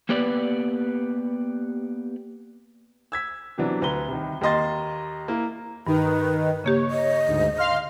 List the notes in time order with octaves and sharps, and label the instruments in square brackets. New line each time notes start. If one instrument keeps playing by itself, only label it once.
[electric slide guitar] A#3 B3 G4 B4 D5
[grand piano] E6 G#6 B6
C3 E3 F#3 B3 D4
D2 B4 A#5 G7
C2 D#3
D#2 A#3 D#5 C6 A6
A#3 E4
[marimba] G2 [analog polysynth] D#3 D#4 [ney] B4
[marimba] C#3 A#3 G4 [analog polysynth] C#5
[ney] D#5
[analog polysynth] D2 G#2
F5 C6 F6